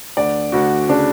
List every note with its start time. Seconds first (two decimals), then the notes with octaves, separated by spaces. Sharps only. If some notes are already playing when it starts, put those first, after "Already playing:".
0.17 D2 D5
0.52 D2 F#4
0.89 C#3 D4